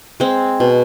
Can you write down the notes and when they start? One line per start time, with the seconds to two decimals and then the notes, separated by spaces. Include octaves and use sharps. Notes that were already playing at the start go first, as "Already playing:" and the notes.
0.20 G#3 C4
0.60 B2